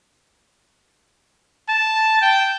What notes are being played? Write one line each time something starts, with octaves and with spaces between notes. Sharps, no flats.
A5
G5